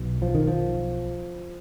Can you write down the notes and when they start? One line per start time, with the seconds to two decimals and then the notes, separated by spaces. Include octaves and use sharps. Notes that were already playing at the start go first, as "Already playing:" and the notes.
Already playing: B1 B2
0.22 F3
0.35 D#3
0.47 F3